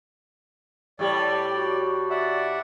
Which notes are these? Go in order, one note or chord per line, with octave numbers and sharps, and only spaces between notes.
A2 G3 D5
F#4
D5 E5 F#5